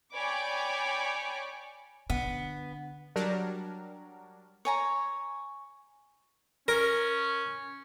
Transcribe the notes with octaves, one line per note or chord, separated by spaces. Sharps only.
C#5 D5 G5 G#5 B5 D6
D3 B3
F#3 G3 D4 A#4
C#5 G#5 A#5
C#4 A#4